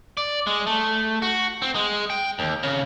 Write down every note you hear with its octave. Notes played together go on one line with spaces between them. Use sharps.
D5
G#3
A3
F#4
C4
G#3
G5
D#2
C#3